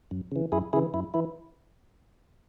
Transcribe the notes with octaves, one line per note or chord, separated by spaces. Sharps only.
F#2
C#3 E3
F#2 E4 G#4
C#3 E3 E4 G#4
F#2 E4
E3 E4